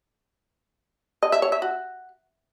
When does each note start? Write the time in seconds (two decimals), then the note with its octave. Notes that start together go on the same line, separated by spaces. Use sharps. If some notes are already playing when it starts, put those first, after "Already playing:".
1.23 D#5
1.32 E5
1.42 C#5
1.52 E5
1.62 F#4